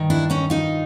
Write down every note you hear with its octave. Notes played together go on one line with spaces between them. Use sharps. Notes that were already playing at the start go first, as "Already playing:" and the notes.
Already playing: G2 D#3
D4 E4
C#4 D#4
D#4 F4